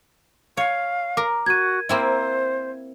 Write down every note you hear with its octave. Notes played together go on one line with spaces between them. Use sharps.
C#5 F5
A#4 D6
F#4 G#6 D#7
A#3 C4 E4 C5